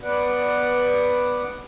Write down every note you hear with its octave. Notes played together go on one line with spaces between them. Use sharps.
B3 B4 D5 F#5